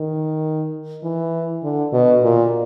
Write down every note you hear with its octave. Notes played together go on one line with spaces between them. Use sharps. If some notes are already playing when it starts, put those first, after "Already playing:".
Already playing: D#3
E3
D3
B2
A#2